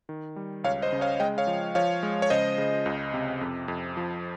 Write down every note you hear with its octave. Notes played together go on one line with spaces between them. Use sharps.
D#3
G3
C#2 C#5 F5
C5 D#5
C#3
C#5 F5
G#3 D#5 G5
C#5 F5
F3
F3 C#5 F5
G#3
C#5
C#3 C5 D#5
C#3
C#2
C3
F2
F2
F3